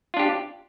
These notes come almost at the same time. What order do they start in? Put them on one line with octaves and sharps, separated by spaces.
F4 D4 G4